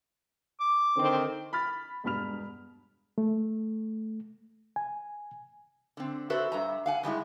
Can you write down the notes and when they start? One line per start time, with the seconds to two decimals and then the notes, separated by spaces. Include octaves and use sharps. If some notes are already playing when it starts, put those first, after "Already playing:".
0.60 D6
0.97 D3 D#3 C4
1.53 B5 F6 A6 B6
2.04 E1 G2 B2 B5 F6 F7
3.18 A3
4.76 G#5
5.97 D3 C4
6.30 F#4 A4 B4 C5 E5
6.52 G2 E5 A#5
6.86 F5 F#5 G#5
7.03 G2 G3 G#3 E4